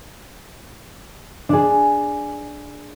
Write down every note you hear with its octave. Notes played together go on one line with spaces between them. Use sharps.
D4 G#4